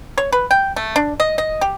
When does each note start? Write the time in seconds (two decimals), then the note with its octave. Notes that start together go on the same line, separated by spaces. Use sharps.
0.18 C#5
0.32 B4
0.51 G5
0.76 A3
0.96 D4
1.20 D#5
1.38 D#5
1.61 G4